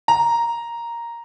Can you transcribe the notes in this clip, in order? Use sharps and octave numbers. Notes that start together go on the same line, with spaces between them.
A#5